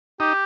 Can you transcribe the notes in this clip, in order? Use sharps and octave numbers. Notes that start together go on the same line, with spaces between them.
D#4 G4